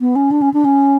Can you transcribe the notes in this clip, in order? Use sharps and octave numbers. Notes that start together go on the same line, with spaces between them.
B3
C#4
D4
C#4
D4
C#4